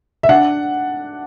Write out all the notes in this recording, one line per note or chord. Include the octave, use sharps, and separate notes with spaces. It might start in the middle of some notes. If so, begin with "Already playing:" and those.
E5
D4 F#5